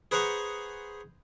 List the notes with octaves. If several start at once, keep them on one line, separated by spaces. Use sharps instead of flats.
G#4 B4 C5 F#5 A#5 C#6